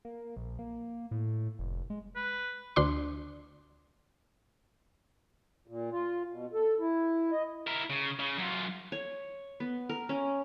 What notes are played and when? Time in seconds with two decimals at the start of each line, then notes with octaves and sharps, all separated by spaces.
0.05 A#3
0.37 A#1
0.59 A#3
1.11 A2
1.59 F1
1.90 G#3
2.16 B4
2.76 D2 D4 C6
5.68 A#2
5.91 F4
6.30 B2
6.53 A4
6.79 E4
7.32 D#5
7.67 E4 A#4
7.90 C#3
8.20 C#3
8.38 F#2 F4
8.92 C#5
9.60 B3
9.89 A#4
10.09 C#4